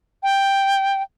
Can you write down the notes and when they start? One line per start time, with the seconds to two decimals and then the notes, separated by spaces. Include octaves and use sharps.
0.23 G5